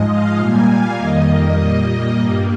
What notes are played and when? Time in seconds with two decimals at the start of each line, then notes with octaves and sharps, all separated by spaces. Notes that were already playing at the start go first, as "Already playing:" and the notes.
Already playing: G#2 F3 G#3 D#5
0.08 F5
0.38 A#2 G3 A#3 G#5
0.68 F5
0.98 F2 D#3 G3 A#3 D#5
1.58 A#2 G3 A#3 D#5
2.19 G2 G3 A#3